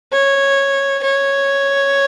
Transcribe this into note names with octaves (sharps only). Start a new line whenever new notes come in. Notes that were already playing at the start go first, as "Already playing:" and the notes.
C#5
C#5